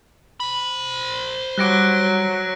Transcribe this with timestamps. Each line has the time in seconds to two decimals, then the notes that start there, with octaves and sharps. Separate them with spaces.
0.40 C5 B5
1.58 F#3 G3 D6 F#6 A#6 D7